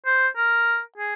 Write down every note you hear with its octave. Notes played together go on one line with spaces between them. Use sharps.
C5
A#4
G#4